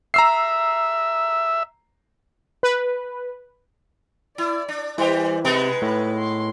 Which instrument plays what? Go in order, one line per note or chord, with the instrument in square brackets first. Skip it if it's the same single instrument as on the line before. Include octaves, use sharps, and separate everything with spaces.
[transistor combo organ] E5 [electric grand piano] A#5 E6 C7
[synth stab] B4
[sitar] E4 [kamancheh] D5
[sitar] D4
[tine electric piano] E3 [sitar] G3 G4 [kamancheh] C5
[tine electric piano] C3 [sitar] G#3 B3 D#4 [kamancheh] B4
[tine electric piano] A2
[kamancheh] C6